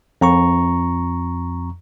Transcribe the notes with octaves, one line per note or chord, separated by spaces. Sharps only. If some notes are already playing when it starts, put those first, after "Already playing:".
F2 A#5 C#6